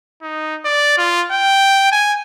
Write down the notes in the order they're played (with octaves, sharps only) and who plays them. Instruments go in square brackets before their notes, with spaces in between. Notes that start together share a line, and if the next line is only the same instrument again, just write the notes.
[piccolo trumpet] D#4
D5
F4
G5
G#5